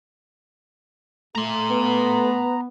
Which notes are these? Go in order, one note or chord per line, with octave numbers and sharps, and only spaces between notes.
A3 A4 A#5 C6
B3 B4